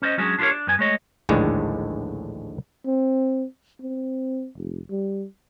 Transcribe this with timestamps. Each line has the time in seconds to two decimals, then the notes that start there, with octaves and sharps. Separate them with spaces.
0.02 C#4 C5 D5 D#5
0.18 F#3 G#3 C#4 D4 F#4 G#4
0.39 D4 F4 G4 A4 A#4 C#5
0.51 D4
0.67 F#2 B3 G#5
0.79 G#3 A3 C#5 D#5
1.29 A#1 D#2 A2 D3 G#3
2.86 C4
3.81 C4
4.55 F1
4.90 G3